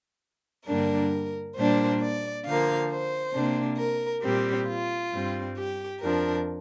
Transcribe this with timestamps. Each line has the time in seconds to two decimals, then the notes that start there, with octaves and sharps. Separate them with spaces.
0.68 G2 D3 G3 A#3 D4 A#4
1.57 A#2 G3 A#3 D4 C5
2.02 D5
2.45 D3 F3 A#3 F5
2.91 C5
3.34 C3 A#3 D4
3.79 A#4
4.24 A#2 G3 C4 G4
4.68 F4
5.13 G2 G3 C4
5.57 G4
6.01 F2 F3 D4 A#4